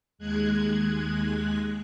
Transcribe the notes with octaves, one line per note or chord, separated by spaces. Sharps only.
D#2 G#3 F#6 G#6